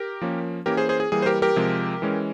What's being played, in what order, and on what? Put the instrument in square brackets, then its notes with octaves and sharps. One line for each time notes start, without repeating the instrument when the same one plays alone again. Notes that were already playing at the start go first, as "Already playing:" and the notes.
Already playing: [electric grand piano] G4 A#4
F3 A#3 C#4
E3 A#3 C#4 G4 A#4
G#4 C5
G#4 C5
G#4
E3 G3 A#3 G#4
C5
G4 A#4
G4 A#4
C3 F3 G#3
E3 G#3 C#4